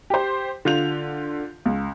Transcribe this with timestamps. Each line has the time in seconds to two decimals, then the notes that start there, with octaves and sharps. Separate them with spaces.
0.10 G4 C5
0.65 D3 F4 G6 F7
1.66 C#2